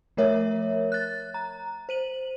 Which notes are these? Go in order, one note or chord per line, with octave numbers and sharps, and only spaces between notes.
F3 A3 A#4 C#5 E5
F#6 A6
A#5
C5 D#7 F#7